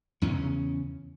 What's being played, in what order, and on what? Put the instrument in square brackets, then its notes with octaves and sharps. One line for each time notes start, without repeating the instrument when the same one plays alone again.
[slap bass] E2 C#3 C#4